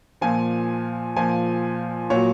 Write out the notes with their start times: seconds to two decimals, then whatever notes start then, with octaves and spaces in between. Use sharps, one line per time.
0.21 A#2 F3 G#5
1.16 A#2 F3 G#5
2.10 A#2 F#3 C#5